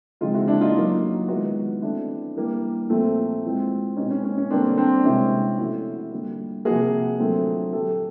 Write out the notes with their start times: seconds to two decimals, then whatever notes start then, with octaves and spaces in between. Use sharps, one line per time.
0.21 C#3 F3 G#3 C4 D#4 F4
0.34 E4 F#4
0.48 D4 E4
0.61 D#4 F4
0.75 A2 F#3 A#3
1.28 D#3 G#3 B3 E4 F#4
1.82 E3 A3 C4 D4 E4
2.36 E3 G3 A#3
2.90 A#2 F3 A3 C4
3.43 A2 E3 G#3 C4
3.97 B2 G#3 C4 C#4 D#4
4.10 C#4
4.24 C#4
4.38 C#4
4.50 D3 G3 A#3 C4 D4
4.77 C4 D4
5.04 C3 E3 G#3 C4 C#4
5.58 A2 F3 A3 C4 E4 F#4
6.12 D3 G3 A#3
6.65 C3 F3 A#3 F#4 G#4
7.19 D3 F#3 A3 C4
7.73 A#2 F#3 A#3 G4 A4